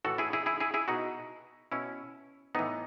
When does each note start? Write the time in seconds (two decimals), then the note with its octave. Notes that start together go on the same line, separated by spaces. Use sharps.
0.05 A2 E3 F#4 A4
0.18 E4 G#4
0.33 E4 G#4
0.46 E4 G#4
0.60 E4 G#4
0.74 E4 G#4
0.88 B2 D#4 F#4
1.72 B2 C#4 E4
2.55 A2 E3 B3 D#4